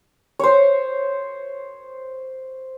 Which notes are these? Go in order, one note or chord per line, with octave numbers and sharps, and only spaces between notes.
C5 C#5